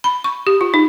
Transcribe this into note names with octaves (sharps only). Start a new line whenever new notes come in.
B5
C#6
G4
F4
D#4